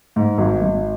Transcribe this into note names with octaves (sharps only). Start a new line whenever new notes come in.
G#2
G#1
G#1